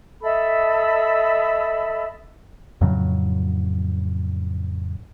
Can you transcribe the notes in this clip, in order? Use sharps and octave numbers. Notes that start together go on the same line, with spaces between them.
A4 D#5 E5 B5
F2 A2 C#3 F#3